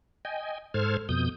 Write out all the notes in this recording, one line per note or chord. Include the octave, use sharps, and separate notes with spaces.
D#5 G5 G#5
G#2 A4 C5 F6 G#6
F2 B2 D#6 G6